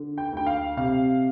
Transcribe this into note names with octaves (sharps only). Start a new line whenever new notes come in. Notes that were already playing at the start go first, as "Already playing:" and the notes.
Already playing: D3
G5
D2 G5
F5
C3 F5